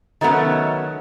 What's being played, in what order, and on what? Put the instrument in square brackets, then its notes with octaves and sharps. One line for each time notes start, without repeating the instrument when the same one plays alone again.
[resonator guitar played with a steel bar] D#3 F#3 A3 B3 C#4